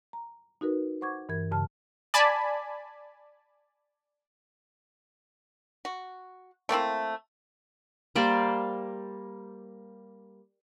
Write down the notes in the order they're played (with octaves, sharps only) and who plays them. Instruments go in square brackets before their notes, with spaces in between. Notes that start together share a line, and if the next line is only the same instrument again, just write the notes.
[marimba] A#5
D#4 F#4 A#4 B4
C5 F#5 C#6 D6 G#6
G2 E3 A#4 G#6
G2 C#3 A5 F6
[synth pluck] D5 G#5 A5 B5
[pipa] F#4
A3 A#3 C4 E4
[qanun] G3 A#3 C5 D5